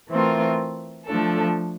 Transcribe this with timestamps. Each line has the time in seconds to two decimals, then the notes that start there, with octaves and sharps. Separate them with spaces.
0.09 E3 A3 C4 F4 A#4
1.06 F3 A3 D4 A4